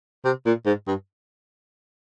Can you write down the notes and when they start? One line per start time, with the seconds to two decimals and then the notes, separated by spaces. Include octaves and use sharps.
0.25 C3
0.46 A#2
0.66 G#2
0.87 G2